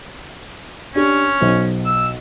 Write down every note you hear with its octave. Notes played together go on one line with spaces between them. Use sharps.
C#4 D4 G4
B1 C5
E6